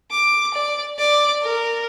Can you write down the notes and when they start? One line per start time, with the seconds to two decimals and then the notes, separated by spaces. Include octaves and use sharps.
0.11 D6
0.54 D5
0.98 D5
1.42 A#4